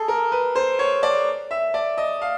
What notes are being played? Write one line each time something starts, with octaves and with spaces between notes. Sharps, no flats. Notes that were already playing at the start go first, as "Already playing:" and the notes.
Already playing: G#4 A4
A#4
B4
C5
C#5
D5
E5
D5
D#5
F5